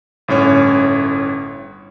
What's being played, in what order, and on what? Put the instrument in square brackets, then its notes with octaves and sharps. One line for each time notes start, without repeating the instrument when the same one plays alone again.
[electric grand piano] G1 A2 C#4 C#5